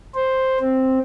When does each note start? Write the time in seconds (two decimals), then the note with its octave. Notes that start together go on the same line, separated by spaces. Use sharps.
0.15 C5
0.60 C4